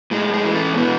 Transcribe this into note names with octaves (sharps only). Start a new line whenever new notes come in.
A2 G#3
G#3
E3
A2 A3
C#4
B2 E3 B3